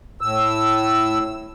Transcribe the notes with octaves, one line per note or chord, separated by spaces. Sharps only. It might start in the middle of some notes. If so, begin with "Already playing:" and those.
A2 E6